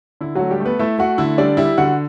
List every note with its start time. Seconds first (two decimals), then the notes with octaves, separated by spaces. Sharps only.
0.21 D3 E4
0.35 F#3 A3 F#4
0.51 G3 G4
0.60 A3
0.66 B3 B4
0.79 A3 E4 E5
0.99 A3 F#4 F#5
1.18 D3 E4 E5
1.38 G3 D4 D5
1.57 G3 E4 E5
1.77 D3 F#4 F#5